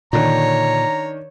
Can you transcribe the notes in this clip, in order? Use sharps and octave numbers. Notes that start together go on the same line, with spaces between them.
A#2 D3 D#3 D4 C#5 A#5